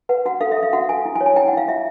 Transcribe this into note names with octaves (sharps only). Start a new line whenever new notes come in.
B4 F#5
F#4 F#5
A4 F5
E5
A4
F5
F#4 F#5
A4 G#5
E4
G#5
C#5
G#5
E4 G5
F#5
E4 F5
F4 E5